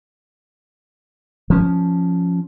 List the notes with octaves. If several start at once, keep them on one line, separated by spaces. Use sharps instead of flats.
F3 C#4